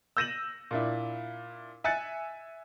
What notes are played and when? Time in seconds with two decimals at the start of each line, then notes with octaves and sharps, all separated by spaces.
0.17 E6 G6 A#6 D#7 E7 F#7
0.71 A#2 D4 E4
1.84 E5 G#5 F#6 A6 C#7